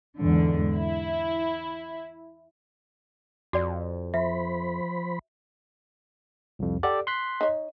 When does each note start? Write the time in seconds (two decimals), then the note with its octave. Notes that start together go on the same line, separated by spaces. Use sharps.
0.17 E2 G#2 D3
0.77 E4
3.53 F2 F#4 D5
4.14 F3 C5 E5 B5
6.59 C2 F2
6.83 G4 A4 D5 F#5
7.07 C6 F#6 B6
7.41 D#4 C#5